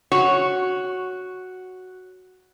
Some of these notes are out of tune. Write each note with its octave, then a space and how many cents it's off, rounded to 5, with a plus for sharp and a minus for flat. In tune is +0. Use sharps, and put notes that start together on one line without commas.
F#4 +0 C#5 +0